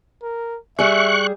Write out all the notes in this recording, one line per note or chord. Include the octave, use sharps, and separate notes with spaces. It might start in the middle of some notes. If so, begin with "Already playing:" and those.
A#4
G3 G#4 E5 C#6 F#6